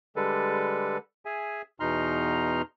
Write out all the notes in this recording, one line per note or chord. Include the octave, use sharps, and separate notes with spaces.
D3 G3 G#3 A4 B4
G#4 E5 G#5
E2 B2 D#4 A#5 C6 F6